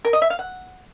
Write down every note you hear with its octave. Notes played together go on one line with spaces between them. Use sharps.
A#4
D#5
E5
F5
F#5